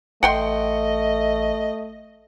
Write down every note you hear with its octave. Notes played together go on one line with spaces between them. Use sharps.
A1 A3 D#5 F#5 G5 C6